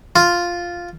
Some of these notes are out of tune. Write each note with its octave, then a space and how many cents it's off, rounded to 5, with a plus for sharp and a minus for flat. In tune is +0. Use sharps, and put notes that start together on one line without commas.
F4 +0